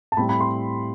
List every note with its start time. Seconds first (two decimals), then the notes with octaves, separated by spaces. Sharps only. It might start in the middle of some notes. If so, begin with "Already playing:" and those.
0.12 A5
0.17 A2 G3 C4 B5
0.29 B5
0.41 C6